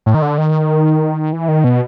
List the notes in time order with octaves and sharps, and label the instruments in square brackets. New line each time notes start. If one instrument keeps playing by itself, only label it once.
[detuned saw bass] A2
D#3
D3
D#3
E3
D#3
B2